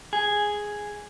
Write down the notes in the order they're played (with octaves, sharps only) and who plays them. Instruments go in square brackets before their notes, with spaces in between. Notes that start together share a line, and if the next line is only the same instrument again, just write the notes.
[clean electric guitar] G#4